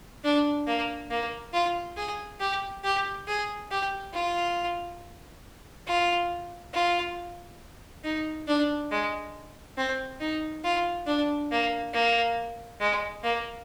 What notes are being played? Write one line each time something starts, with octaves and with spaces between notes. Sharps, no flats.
D4
A#3
A#3
F4
G#4
G4
G4
G#4
G4
F4
F4
F4
D#4
D4
G#3
C4
D#4
F4
D4
A#3
A#3
G#3
A#3